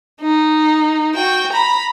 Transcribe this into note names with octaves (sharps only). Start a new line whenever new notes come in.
D#4
F#4 G5
A#5 B5